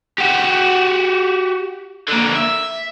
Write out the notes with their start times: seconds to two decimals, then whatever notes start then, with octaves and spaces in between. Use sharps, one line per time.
0.18 F#4 G4
2.08 D3 A#3
2.36 E5